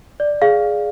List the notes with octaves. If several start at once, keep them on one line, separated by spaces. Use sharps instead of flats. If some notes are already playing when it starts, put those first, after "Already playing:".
D5
G#4 F5